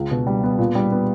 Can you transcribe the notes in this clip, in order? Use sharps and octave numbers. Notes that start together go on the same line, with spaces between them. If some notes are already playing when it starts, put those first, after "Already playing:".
Already playing: C#2
B2
G3
B3
A#2
G3
B3